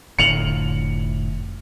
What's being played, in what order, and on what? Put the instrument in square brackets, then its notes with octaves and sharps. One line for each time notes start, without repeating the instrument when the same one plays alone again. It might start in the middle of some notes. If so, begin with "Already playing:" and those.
[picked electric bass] F1 A2 D3 [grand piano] C#7 F7 F#7